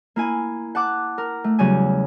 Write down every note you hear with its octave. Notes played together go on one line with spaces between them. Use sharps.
A#3 E4 G#5
F#5 A5 D6 F#6
A#4
A3
E2 C#3 F#3 G3 G#5